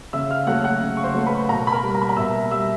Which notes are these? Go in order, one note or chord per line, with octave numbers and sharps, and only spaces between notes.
C#3 E5 E6
F5 F6
F#3 A3 F#5 F#6
F#5 F#6
C#3
C#6
C5 C6
F#3 A3
B4 B5
B2 A#4 A#5
B5
A#4 A#5
G3
A#5
B5
A#4 A#5
B2 E5 E6
G3 E5 E6